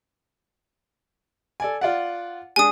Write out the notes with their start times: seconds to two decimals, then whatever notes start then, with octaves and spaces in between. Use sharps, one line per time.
1.60 A4 D5 G#5
1.81 F4 D5 F#5
2.56 G#3 D4 G#5 D#6